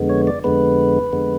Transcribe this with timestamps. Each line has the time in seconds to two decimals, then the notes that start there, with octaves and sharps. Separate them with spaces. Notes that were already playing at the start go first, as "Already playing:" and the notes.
Already playing: F2 D3 G#3 B3
0.09 C#5
0.27 D5
0.44 F2 D3 G#3 B3 B4
1.13 F2 D3 G#3 B3